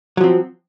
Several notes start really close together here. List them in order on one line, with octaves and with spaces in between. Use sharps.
F#3 F3 C4